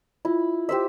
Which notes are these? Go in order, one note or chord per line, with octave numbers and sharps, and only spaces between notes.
E4 F4
G4 C5 E5